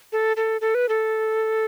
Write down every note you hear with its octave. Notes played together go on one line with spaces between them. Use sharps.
A4
A4
A4
B4
A4